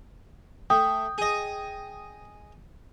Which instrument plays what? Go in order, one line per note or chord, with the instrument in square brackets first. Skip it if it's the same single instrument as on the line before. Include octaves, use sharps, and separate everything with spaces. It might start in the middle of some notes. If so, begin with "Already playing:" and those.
[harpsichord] A3 [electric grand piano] G5 [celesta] D#6
[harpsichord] G#4 D#5